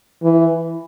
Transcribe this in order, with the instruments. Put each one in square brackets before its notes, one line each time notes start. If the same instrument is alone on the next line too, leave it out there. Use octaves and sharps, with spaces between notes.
[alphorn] E3